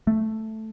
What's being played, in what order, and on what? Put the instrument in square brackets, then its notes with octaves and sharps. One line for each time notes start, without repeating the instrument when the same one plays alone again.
[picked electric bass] A3